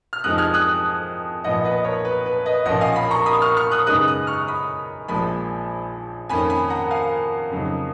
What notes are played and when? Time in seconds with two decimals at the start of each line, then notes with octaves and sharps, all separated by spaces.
0.13 F6
0.24 F2 F3 G#3 D#4 D#6 F#6
0.38 F6 G#6
0.54 D#6 F#6
1.44 B1 A#2 F3 B3 D#5 F#5
1.64 B4 D#5
1.85 A#4 C#5
2.05 B4
2.26 B4
2.46 B4 D#5
2.65 B1 A#2 F3 A#3 C#4 D#5 F#5
2.81 F5 G#5
2.96 G#5 B5
3.11 A#5 C#6
3.26 B5 D#6
3.42 C#6 F6
3.57 C#6 F6
3.71 D#6 F#6
3.87 F#2 C#3 G#3 B3 D#4 D#6 F#6
4.07 D#6 F#6
4.27 C#6 F6
4.47 B5 D#6
5.08 A#1 A#2 F3 G#3 G#5 B5
6.29 F2 D#3 A#3 C#4 G#5 B5
6.50 G#5 B5
6.70 F#5 A#5
6.91 F5 G#5
7.51 F2 C#3 F#3 A#3 D#4